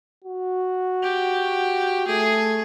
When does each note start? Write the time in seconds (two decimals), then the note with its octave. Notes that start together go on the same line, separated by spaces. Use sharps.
0.24 F#4
1.03 G4
2.08 A3 G#4